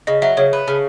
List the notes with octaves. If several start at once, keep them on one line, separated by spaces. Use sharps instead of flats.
C#3 D#5
F#3 E5
C#3 C#5
B3
C#3